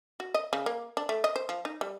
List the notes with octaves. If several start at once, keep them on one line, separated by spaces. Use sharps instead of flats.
F#4
D#5
C#3
A#3
D4
A3
D#5
C5
F3
D#4
G3